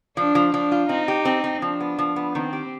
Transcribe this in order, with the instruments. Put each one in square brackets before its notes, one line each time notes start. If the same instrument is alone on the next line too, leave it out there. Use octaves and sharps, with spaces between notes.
[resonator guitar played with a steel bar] F3 [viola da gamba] D4
[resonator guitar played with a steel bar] F3
[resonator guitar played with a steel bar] F3 [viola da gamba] D4
[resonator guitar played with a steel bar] F4
[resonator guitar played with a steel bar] C4 [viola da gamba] D#4
[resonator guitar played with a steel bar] G4
C4
C4
[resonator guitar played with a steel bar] F3 [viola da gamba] D4
[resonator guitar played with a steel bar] B3
F3
B3
[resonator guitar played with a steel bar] D#3 [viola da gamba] C4
[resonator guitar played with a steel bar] G4